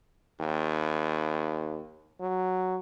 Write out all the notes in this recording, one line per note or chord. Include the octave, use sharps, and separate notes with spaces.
D#2
F#3